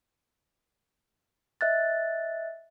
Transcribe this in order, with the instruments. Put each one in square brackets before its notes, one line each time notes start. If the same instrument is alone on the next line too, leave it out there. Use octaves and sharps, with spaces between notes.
[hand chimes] D#5 E5 F#6 A6